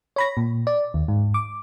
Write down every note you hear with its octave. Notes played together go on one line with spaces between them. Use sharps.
C#5 B5 A#6
A#2
D5
D#2
G#2
D6